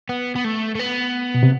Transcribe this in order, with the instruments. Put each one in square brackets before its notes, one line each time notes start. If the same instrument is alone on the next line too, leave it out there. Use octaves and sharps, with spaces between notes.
[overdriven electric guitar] B3
B3
A3
A3
B3
[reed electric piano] B2
C3